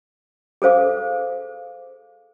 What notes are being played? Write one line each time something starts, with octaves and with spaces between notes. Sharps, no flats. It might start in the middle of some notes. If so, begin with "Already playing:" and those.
G#4 A4 C5 F5 D6